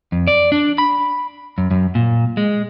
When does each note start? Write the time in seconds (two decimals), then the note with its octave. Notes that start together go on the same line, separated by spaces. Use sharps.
0.12 F2
0.27 D5
0.52 D4
0.78 B5
1.58 F#2
1.71 F#2
1.95 A#2
2.37 G#3